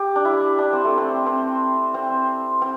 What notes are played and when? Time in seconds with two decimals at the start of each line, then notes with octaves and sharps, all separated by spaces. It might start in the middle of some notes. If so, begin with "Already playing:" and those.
Already playing: G4
0.16 D4
0.25 E4
0.59 D4
0.73 C4
0.85 A3
0.98 C4
1.26 C4
1.94 C4
2.62 C4